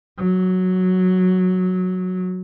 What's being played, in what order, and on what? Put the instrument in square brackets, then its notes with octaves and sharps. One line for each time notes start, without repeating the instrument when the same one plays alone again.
[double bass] F#3